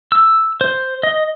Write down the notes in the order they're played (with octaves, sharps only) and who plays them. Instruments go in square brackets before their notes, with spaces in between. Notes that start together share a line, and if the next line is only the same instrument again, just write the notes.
[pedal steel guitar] E6
C5
D#5